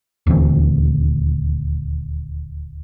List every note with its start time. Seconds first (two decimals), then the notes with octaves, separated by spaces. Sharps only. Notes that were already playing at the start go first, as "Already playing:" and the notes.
0.27 D#1 D2 E3 C4